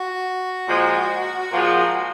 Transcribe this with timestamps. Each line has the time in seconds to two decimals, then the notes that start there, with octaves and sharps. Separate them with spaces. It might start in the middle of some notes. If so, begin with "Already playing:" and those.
Already playing: F#4
0.67 A#2 F3 G#3
1.52 A#2 F3 G#3